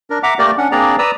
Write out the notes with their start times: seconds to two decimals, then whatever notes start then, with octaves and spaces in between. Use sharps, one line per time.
0.10 D4 A#4
0.23 E5 F#5 A#5 D6
0.39 A3 A#3 G4 A#4 D5
0.58 C#4 D4 F#5
0.72 A#3 C4 D4 G#4 D5 A#5
0.99 B4 D5 A#5 D#6 E6